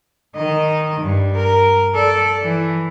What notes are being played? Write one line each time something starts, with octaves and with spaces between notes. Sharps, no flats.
D#3 D#5
G2
A#4
A4 D5
E3